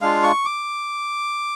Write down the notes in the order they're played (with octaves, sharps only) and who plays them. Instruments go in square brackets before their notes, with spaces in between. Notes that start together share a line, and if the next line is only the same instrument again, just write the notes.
[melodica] G#3 D4 F4 F5
C#6
D6